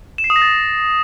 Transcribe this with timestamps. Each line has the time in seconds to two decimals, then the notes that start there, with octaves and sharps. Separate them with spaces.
0.18 E7
0.24 C7
0.30 D#6
0.36 A#6
0.42 A6